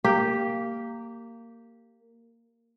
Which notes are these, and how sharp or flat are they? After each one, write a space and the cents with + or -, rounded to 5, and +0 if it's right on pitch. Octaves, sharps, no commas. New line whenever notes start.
A#3 -15 G4 +0